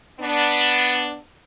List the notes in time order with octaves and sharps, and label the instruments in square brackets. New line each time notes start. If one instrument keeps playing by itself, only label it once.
[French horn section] B3 D4